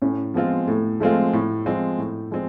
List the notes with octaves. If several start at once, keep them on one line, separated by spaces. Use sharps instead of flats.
A2 C#4
F3 G#3 B3 C4 F4
A2 A3
F3 G#3 A3 C4 F4
A2
F3 G#3 C4 F4
A2
F3 G#3 C4